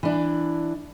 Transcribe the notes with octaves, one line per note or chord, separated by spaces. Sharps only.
E3 D4